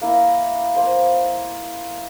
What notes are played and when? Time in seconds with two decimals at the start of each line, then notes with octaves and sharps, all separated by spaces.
0.01 A#3 E4
0.76 A#3 C5